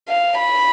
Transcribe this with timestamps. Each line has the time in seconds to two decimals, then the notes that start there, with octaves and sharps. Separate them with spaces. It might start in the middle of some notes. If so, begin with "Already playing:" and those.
0.08 F5
0.38 B5